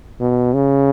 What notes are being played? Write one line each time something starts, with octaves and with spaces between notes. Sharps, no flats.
B2
C#3